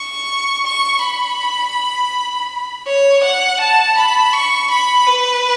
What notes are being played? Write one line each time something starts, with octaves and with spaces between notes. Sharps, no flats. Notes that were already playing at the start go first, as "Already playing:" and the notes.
Already playing: C#6
C#6
B5
C#5
F#5
A5
B5
C#6
B5
B4